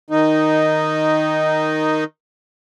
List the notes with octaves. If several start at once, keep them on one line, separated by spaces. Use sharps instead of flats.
D#3 D#4